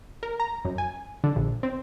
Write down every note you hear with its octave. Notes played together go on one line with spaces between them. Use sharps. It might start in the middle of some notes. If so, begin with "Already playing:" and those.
A#4
A#5
F#2
G#5
D3
A#1
C4